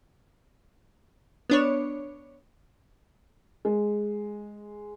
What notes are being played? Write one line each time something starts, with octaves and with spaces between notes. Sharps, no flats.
B3 D4 C#5
G#3